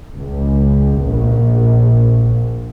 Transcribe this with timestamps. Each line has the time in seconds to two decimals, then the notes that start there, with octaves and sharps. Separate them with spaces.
0.16 C#2
1.04 A#1